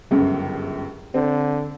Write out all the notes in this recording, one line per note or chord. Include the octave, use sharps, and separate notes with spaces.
G1 C#2 F#2
D3 C4